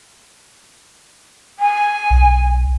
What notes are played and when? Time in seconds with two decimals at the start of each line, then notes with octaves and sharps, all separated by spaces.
1.59 G#5
2.10 B1